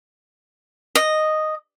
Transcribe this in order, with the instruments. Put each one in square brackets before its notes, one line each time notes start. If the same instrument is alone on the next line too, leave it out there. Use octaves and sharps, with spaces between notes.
[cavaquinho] D#5